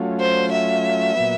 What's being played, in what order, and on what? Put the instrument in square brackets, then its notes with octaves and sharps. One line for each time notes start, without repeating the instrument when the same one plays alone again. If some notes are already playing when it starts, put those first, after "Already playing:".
Already playing: [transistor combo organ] F#3 A3 C#4 F4
[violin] C5
E5
[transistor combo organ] A#2 F#3 B3